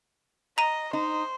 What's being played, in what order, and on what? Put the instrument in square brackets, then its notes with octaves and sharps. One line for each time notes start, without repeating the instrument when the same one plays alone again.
[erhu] D#5 [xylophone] A#5 D#7
[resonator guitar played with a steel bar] D#4 [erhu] C5